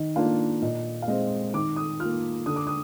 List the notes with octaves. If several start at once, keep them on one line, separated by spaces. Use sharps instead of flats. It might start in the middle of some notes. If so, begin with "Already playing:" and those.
Already playing: D#3 D#5
A#3 D4 F4 F5
A#2 D#5
F5
G#3 C4 D#5
D#3 D6
D#6
A#3 F4 F6
D3 D#6
D6
D#6